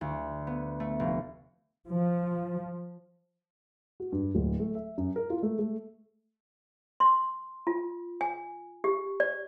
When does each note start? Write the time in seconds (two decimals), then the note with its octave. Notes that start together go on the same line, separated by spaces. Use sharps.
0.01 D2
0.47 B3
0.80 A3
1.00 F1
1.88 F3
4.00 F#4
4.12 G2
4.35 D1
4.60 A3
4.75 E5
4.98 F#2
5.16 A#4
5.30 F4
5.43 A3
5.59 A3
7.00 C6
7.67 F4
8.21 G#5
8.84 G4
9.20 D5